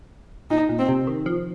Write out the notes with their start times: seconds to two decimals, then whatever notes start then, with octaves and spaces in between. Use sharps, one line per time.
0.50 A#2 D#4
0.69 A#2
0.79 C4
0.89 C3
1.07 D#3
1.26 F3